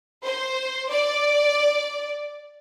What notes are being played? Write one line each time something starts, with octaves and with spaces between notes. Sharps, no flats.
C5
D5